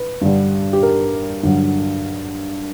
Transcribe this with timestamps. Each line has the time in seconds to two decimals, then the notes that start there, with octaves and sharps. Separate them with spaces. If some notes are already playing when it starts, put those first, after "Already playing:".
Already playing: B4
0.21 G2 D3 G3
0.73 G4
0.83 A#4
1.43 G2 D3 F#3